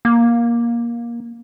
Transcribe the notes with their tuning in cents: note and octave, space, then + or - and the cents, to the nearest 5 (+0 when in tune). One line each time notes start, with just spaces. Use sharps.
A#3 +15